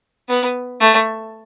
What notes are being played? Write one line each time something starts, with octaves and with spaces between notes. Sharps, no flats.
B3
A3